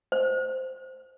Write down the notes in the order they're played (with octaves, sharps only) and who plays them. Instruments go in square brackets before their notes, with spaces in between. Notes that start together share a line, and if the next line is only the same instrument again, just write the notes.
[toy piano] C5